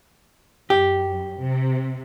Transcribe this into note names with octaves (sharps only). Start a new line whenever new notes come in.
F#2 G4
C3